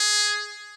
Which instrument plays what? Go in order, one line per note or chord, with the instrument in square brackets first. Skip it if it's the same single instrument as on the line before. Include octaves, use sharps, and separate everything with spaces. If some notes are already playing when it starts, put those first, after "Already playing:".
Already playing: [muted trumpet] G#4